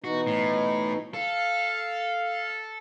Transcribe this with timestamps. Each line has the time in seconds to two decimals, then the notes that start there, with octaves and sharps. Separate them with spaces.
0.04 B2 E3 D#4 F#4
0.27 A2
1.14 A4 F5